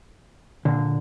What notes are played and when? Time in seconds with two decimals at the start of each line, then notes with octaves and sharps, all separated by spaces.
0.65 A#2 D3